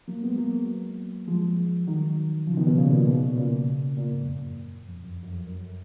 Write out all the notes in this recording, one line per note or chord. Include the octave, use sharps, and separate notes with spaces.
F#3 A#3
G#3 B3
F#3 A#3
F3 G#3
D#3 F#3
C#3 F3
B2 D#3
B2
A#2 C#3
A#2
B2
A#2
A#2 C#3
A#2
G#2
F2
F#2
F2
F#2
F#2
F2
F#2